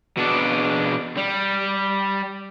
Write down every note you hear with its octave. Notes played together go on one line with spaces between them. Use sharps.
B2 D4
G3